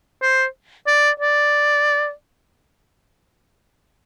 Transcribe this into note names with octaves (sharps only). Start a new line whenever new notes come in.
C5
D5
D5